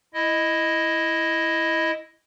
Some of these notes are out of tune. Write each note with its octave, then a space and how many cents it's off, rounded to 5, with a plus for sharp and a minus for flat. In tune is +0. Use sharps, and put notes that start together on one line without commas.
E4 +0 D#5 +5